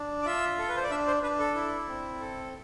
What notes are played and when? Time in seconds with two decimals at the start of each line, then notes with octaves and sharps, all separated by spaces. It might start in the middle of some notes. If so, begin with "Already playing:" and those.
Already playing: D4
0.22 D5
0.26 F4 E5
0.58 A4
0.69 B4
0.76 C5
0.83 D5
0.90 D4 E5
1.07 C5
1.23 D4 B4
1.39 A4
1.55 E4
1.88 C4
2.20 A4